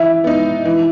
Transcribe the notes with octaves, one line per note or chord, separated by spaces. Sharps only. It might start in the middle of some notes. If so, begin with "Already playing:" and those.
Already playing: E3 E5
B3 D#4
E3